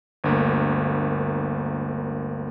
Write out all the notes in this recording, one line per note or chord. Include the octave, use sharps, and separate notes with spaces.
G1 D2 A#3